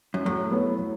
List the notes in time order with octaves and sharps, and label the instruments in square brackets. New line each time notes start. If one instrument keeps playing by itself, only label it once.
[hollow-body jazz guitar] F#2
[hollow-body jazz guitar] A2 [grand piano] F#3
[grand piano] B3 A4 C#5
F#3